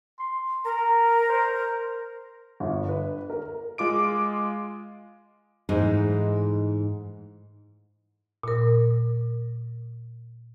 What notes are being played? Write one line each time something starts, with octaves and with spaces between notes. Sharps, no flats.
C6
A#4 A#5
C5
G1
B4
A#4
G#3 F4 D6 D7
G#2 E3 A3 D#4 G#4
A#2 A#4